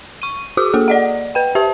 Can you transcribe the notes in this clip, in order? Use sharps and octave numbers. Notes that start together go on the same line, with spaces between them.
C#6 D#7
F#4 G#4 D6 D#6
A#3 G#4 A4
D5 D#5 F#5
B4 G5
G4 C5 E5 A5